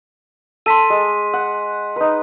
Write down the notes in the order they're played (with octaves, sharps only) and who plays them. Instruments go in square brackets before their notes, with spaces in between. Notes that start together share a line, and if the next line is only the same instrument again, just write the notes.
[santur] A4 [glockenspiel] C6 B6 D#7
[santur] G#3
F#5
D#4 B4